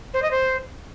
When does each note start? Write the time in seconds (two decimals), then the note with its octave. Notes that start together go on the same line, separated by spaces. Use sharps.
0.14 C5
0.22 D#5
0.31 C5